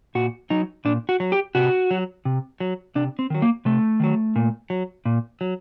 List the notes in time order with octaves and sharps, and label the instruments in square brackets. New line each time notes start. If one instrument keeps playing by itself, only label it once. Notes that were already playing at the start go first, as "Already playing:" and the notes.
[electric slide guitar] A#2 F#4
F#3 D#4
A#2 D4
F#4
F#3
G4
C3 F#4
F#3
C3
F#3
C3 D4
C4
D#3 F#3
A#3
C3 A3
D#3 F#3
A#2
F#3
A#2
F#3